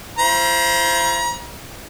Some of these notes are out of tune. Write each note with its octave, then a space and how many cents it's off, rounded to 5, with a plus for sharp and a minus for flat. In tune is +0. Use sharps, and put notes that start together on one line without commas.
F4 -45 C5 +0 A#5 +40